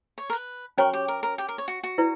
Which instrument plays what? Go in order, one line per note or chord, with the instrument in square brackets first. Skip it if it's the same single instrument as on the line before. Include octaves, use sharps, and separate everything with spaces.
[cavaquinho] C#5
A#4
B4
[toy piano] C#4 F#4 C#5 G5 C#6 [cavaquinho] A#4
[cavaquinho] G4
A#4
A#4
G4
A#4
C#5
F#4
F#4
[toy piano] E4 B4 D5